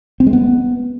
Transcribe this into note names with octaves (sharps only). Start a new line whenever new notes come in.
C4
G#3
B3